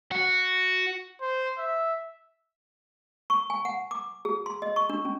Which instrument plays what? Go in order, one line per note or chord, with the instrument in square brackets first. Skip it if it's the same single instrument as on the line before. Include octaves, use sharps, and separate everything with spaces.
[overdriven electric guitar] F#4
[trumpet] C5
E5
[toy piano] C#6
G#5
F#5
D6
G#4
C6
D#5
C#6
D4
C#4